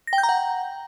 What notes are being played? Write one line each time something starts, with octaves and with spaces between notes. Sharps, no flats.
A#6
G5
G6
A#5
F#5